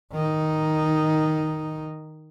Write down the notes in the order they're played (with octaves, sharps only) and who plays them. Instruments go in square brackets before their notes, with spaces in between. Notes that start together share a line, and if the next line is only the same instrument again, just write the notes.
[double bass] D#3 D#4